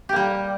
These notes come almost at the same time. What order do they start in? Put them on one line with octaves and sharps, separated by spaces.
G4 A#3 G3